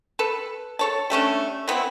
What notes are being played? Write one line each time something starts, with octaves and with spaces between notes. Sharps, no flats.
A4 B4
A4 C#5 A5
G3 A3 C#4 D4
E3 B3 C4 E4